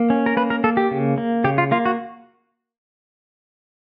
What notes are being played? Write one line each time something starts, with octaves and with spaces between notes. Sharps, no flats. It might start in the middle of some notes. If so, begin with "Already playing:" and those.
Already playing: A#3
C#4
A#4
A#3 B4
A#4
A#3 A4
G4
C#3
A#3
C#3 G4
F4
A#3 F4
F#4